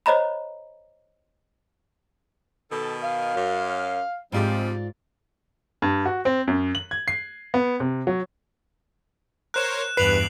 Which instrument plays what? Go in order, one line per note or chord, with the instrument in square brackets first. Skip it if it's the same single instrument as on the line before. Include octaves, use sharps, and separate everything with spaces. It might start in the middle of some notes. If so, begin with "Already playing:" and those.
[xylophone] C5 C#5 D#5 A#5 B5
[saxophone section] B2 D#3 [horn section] A4
[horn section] F5
[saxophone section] F#2
[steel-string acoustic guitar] G#2 F4 D5 [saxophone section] C3 F3 G3 [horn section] G#3 C4
[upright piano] G2
F#4
C4
F#2
F#7
G#6
C7
B3
C3
F#3
[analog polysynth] A#4 C5 C#5 [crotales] F#6 E7
[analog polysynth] E2 G2 D7 [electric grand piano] B4 [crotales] C7 F7 F#7